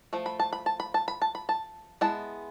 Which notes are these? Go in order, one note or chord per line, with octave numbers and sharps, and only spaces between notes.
F3 A3
B5
A5
B5
A5
B5
A5
B5
A5
B5
A5
G#3 B3 E4 A5